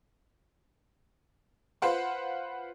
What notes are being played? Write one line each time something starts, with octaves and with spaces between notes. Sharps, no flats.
F4 B4 C5 F#5 C6